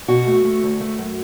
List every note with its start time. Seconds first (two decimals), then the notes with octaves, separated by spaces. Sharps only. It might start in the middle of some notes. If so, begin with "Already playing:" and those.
0.08 B2 F#4
0.27 A3
0.45 A3
0.63 D2
0.81 A3
0.98 F#2